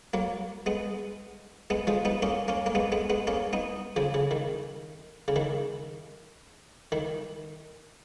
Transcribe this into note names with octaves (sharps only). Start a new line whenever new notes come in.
F#3 A#3
G#3 B3
G#3 B3
F3 G#3
B3 D#4
A#3 C#4
A#3 C#4
A#3
G#3 B3
G#3 B3
G#3 B3
A#3 C#4
B3 D#4
C#3 F3
C#3
D#3
C#3
D#3
D#3